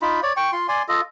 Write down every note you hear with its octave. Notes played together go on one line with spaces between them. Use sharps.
D#4 F4 B5
C#5 D5
G5 C#6
F4 C6
D5 G#5 C6
F4 A4 D#5